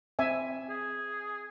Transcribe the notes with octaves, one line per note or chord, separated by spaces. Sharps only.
C4 E5 G#5
G#4